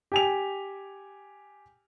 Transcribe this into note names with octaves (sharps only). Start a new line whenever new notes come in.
G4 G#5 F7